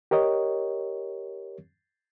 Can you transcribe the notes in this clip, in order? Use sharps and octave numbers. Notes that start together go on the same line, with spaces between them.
G4 A#4 C#5 D#5